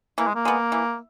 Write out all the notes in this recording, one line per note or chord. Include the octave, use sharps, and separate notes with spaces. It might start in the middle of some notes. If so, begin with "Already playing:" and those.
E3 A#3
G#3
A#3
G#3 B3
E3